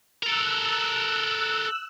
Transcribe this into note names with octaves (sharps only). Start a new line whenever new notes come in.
A4 A#4 E6 F#6